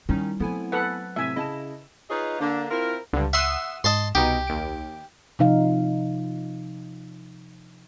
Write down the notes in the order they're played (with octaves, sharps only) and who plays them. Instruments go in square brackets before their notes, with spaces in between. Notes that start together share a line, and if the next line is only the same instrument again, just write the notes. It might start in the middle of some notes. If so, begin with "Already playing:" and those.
[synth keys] D#3 C#4 D#4 [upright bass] G3 E4
[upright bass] F#3 [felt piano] A3 C4 [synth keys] B3 E4 G#5
[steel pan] A4 B4 F#5
[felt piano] A2 C3 C4 [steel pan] E5 G#5
[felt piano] C#3 A5 E7 [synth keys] E4 D#5
[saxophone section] D#4 F4 G#4 B4 C#5 D#5
D3 A#3 D4
C4 E4 F4 A#4
[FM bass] C#2 [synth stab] G2 D3
[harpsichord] E5 C6 [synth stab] F#5 D#6 E6
[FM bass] G#2 [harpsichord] D#5 A5 C6
[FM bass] C2 [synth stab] B2 D#4 D7 [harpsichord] G4
[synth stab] D#2 D7
[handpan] C3 F3 D#4 F5